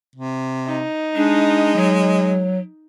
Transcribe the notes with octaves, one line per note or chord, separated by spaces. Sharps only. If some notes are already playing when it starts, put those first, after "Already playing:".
C3
D#4
G#3 D4
F#3